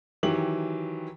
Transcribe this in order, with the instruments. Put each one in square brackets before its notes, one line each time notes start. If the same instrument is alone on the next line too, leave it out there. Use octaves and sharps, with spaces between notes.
[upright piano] D#3 E3 F#3 G4 F#7